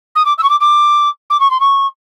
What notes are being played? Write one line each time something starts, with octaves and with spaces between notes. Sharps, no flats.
D#6
D6
E6
C#6
D6
D6
D6
C#6
C6
C#6